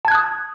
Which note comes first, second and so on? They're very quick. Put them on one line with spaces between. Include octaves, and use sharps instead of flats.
A5 G#6 F#6 D#6